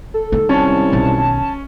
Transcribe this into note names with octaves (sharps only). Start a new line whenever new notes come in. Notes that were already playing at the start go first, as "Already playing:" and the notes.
A4
D#3 G#3
C2 C#4 A5
B1 D#3 A5